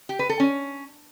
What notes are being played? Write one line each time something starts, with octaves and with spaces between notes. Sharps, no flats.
G4
B4
A4
C#4